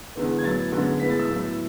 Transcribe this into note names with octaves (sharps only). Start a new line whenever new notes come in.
E2 D3 G#3 B3
G#6
A2 F#3 B3 A6
F#2 D3 G#3 B3
A2 G#3 B3 B6
A6
E6
A2 F#3 B3